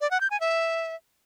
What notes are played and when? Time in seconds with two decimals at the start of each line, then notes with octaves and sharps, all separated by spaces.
0.01 D5
0.11 F#5
0.21 G6
0.31 G#5
0.40 E5